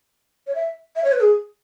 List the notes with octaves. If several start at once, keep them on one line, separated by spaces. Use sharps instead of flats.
C#5
E5
E5
C#5
B4
G#4